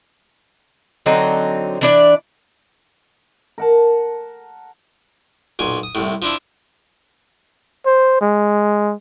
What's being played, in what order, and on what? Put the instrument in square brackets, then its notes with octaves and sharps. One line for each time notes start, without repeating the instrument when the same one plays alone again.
[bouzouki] D3 F#3 C4 D#4
E3 D4 D5
[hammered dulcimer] A#4 F#5 A5
[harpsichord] B1 A#2 G#5
D#6
C2 A2
F3 D4 E4
[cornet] C5
G#3